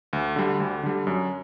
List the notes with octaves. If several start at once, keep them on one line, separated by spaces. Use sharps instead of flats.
D2
D3 G3
D2
D3 G3
F#2